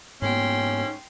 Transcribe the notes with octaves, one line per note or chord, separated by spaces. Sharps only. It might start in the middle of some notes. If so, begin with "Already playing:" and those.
G#2 A#3 B3 C#4 G5 C6